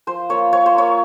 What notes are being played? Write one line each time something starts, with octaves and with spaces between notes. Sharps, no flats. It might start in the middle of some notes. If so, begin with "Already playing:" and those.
F3 C5
A#3 F4 C#5
F3 C#5
C5
A#3 F4 C#5